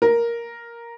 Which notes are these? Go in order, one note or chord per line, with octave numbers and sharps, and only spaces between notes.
A#4